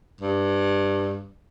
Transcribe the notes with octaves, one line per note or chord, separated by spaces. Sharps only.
G2